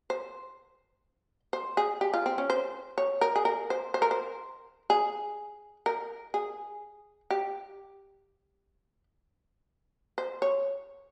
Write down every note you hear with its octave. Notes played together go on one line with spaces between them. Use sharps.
C5
C5
G#4
G4
F4
C4
C#4
C5
C#5
A#4
G#4
A#4
C5
C5
A#4
C5
G#4
A#4
G#4
G4
C5
C#5